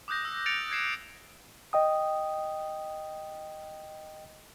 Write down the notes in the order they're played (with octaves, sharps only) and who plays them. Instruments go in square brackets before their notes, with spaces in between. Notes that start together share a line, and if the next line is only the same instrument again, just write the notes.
[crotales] D6 D#6 F#6 G6 A#6
E6
F#6 A6 C#7 D7 F7
G#6 C7 E7
[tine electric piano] D#5 G5 D#6